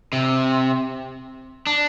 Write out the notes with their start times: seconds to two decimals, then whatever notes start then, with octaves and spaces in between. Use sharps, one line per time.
0.13 C3
1.67 D4